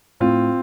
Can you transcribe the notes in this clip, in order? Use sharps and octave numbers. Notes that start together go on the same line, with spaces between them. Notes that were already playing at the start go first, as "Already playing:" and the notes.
A2 C4 F4